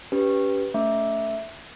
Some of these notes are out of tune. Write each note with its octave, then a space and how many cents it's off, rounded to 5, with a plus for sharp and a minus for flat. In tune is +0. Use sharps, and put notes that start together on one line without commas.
C#4 +35 G4 +0 B4 +0
A3 +0 C#4 +25 E5 +0